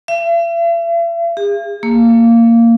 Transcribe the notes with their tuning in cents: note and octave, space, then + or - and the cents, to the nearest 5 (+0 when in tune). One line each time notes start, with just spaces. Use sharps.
E5 +45
G#4 -45
A#3 -15